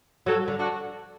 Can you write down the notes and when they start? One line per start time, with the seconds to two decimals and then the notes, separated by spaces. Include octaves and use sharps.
0.26 F#3 F#4 A4
0.48 D3
0.59 D4 F#4